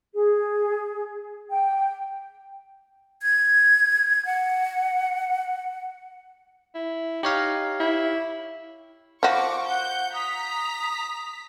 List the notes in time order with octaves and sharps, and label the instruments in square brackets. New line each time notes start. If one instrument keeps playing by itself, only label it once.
[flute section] G#4
G5
[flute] G#6
F#5
[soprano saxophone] E4
[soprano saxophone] D#4 [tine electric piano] G4 C#5 F5
[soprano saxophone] E4
[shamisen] F3 F#4 [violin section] C#6 D6
[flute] F#5 [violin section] G6
[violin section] A#5 B6 [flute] D#6